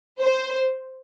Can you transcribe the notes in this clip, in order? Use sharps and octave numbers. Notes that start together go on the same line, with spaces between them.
C5